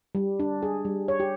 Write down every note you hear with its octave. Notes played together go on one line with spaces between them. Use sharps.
G3
D4
G#4
G3
C#5
G4